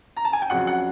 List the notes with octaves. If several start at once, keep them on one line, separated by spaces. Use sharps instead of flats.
A#5
A5
G#5
G5
F2 C#3 F#3 F#5
F#5